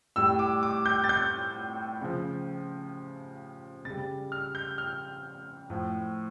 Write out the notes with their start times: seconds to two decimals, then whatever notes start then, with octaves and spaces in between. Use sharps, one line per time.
0.16 A2 G3 E6
0.39 D6
0.63 D6
0.86 G6
1.04 A6
1.09 G6
2.01 C#3 F3
3.85 C#3 A6
3.90 G3
4.32 F6
4.55 G6
4.78 F6
5.70 A2 F3